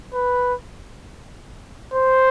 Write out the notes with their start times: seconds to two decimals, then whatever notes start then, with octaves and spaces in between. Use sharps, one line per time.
0.13 B4
1.94 C5